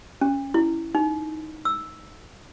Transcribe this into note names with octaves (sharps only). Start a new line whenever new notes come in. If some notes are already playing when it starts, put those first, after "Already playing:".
C#4
E4
D#4
E6